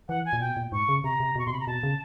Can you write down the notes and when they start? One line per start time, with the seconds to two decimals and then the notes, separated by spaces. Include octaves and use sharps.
0.09 E3 F#5
0.25 G#5
0.33 A#2
0.41 B2 G5
0.57 A#2
0.72 G#2 C#6
0.89 C#3
1.04 C3 A#5
1.20 C3
1.36 B2
1.39 C#6
1.46 B2 C6
1.51 C3 B5
1.60 A#5
1.67 B2 A5
1.83 C#3